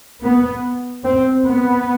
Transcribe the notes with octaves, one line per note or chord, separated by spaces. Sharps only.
B3
C4
B3